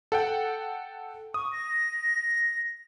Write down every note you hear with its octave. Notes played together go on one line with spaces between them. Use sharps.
A4 F#5 G5
C#6 D#6
A#6